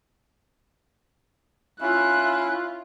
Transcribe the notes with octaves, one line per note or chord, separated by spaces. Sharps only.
C#4 E4 F4 F#6